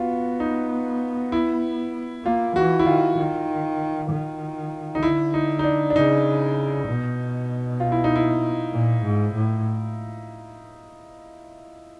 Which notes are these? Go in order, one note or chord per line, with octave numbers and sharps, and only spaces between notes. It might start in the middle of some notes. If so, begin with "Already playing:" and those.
Already playing: B3 F4 F#4
D#4
E4
A#3 F4
E3 F#4
E4
D#3 F4
D#3
D#3
D#4
D3 E4
D#4
D#4
D4
D4
C#3 D#4
B2
F4
E4
D#4
E4
A#2
G#2
A2